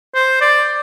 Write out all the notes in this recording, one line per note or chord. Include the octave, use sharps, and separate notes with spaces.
C5
D5